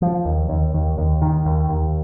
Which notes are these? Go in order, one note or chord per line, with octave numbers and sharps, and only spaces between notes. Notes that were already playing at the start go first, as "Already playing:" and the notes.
F3
D#2
D#2
D#2
D#2
D#3
D#2
D#2